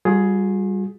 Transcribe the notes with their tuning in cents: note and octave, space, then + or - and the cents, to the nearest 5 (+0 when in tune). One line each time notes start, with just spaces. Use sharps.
G3 +0 F4 +45 G#4 +10